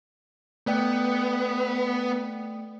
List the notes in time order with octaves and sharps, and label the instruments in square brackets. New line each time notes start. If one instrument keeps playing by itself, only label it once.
[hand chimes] A3 D5 G5 [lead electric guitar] B3